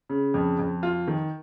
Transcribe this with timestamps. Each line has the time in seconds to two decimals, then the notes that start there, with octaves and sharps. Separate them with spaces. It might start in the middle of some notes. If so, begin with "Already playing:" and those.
0.10 C#3
0.34 F2
0.59 F2
0.83 F4
1.08 D#3